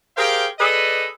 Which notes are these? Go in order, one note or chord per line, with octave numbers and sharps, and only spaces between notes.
G4 G#4 A#4 C5 F5 G5
G#4 A4 B4 D5 D#5